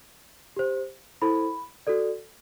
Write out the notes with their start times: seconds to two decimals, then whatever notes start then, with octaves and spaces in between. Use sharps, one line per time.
0.56 G4 C5
1.22 E4 A4 C5 B5
1.87 F#4 A4 D5